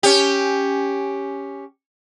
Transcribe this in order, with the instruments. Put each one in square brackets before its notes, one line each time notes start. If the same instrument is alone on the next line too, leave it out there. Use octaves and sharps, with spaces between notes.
[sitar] C#4 G4